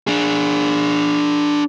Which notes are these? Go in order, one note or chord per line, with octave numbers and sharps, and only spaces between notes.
D4 G#4